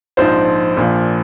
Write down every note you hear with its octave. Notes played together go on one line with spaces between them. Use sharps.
A#1 G#2 F3 C5
A#1 A#2 F3